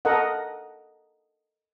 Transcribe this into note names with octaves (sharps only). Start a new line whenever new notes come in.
A4 A#4 D#5 F#5